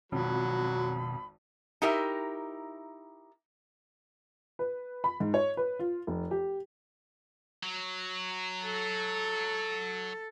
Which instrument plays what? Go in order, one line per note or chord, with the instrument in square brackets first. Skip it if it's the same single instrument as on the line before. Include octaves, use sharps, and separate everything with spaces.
[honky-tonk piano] G#1 F2 [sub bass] B2 [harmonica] F#3 [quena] B5
[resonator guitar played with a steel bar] D#4 E4 G4 A#4 E5
[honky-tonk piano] B4
B5
G#2
C#5
B4
F4
F1
G4
[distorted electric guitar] F#3
[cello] A4